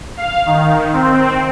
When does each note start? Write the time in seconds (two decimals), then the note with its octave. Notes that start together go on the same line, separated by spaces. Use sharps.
0.17 F5
0.46 D#3
0.93 C4